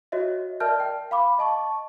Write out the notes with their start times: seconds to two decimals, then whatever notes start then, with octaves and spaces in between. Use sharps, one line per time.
0.12 F#4 C#5 D#5 E5
0.60 A#4 D5 E5 A5 F6 G6
0.80 G5
1.11 F5 B5 D6
1.39 D#5 A5 C#6